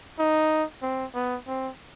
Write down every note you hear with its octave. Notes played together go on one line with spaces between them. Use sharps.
D#4
C4
B3
C4